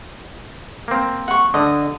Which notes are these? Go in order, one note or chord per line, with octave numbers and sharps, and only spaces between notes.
A#3 C4
F#5 C#6
D3 D#5